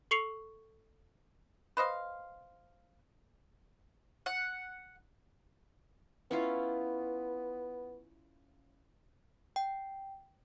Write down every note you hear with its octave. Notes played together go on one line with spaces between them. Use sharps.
A4 C#6 C7 C#7 F7
B4 C5 D#5 F5
F#5
B3 C#4 E4 F4
G5